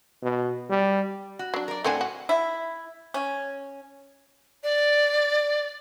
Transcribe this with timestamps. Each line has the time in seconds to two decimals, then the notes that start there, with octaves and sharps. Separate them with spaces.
0.23 B2
0.70 G3
1.39 F#4
1.54 F#3 D4
1.68 A#4 D5
1.84 A2 A3 C4 D4 F#5 G#5
2.01 F#4
2.29 E4
3.14 C#4
4.63 D5